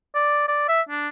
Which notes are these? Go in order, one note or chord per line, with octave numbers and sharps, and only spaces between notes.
D5
D5
E5
D4